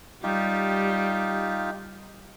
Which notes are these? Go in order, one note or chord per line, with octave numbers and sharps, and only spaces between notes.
G3 D#4 F4 G4